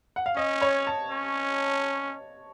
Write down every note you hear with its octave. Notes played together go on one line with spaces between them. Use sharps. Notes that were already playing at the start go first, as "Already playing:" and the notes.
F#5
F5
C#4 D#5
C#5
A5
C#4